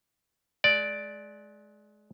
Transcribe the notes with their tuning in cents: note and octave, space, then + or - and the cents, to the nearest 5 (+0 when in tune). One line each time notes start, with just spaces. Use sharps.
G#3 +30 D5 +0